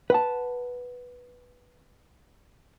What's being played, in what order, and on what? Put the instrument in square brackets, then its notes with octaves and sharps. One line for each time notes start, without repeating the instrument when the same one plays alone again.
[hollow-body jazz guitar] B4 F#5 A5